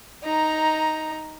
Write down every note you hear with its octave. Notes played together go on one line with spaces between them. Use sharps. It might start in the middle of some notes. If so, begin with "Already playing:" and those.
D#4 A#5